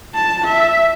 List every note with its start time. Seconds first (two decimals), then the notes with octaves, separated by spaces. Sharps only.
0.15 A5
0.45 E5